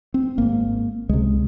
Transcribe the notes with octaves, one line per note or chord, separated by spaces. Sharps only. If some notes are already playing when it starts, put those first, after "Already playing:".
C4
G#1 G#2 A#3
C#2 C3 G#3